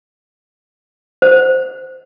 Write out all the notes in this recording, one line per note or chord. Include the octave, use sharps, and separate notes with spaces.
C5